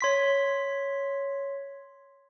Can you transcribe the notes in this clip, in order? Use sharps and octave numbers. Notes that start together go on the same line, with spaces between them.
C#5 C6 B6